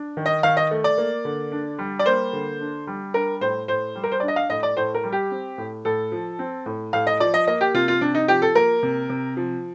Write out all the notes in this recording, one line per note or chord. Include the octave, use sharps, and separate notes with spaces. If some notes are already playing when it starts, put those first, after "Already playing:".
Already playing: D4
D#3
D#5
D#3 F5
D#5
A3
D5
A#3
D3
D4
G3
D5
A#3 C5
D3
D4
G3
D4 A#4
A2 C5
A2 C5
G3
A#4
C5
D4 D5
D#5
F5
A2 D#5
D5
A2 C5
A#4
G3
G4
C4
A2
A2 A4
F3
C4
A2
A2 F5
D#5
F3 D5
D#5
A#3 D#5
G4
C3 F4
F4
C3 D4
D#4
F3 G4
A4
A#3 A#4
C3
C3
F3